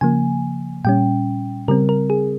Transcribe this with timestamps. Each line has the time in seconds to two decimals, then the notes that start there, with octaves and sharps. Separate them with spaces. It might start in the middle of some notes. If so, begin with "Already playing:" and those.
0.01 C#3 F3 A#3 G#5
0.85 A#2 G3 C#4 G5
1.68 C#3 G3 C4 A#4
1.89 A#4
2.10 G#4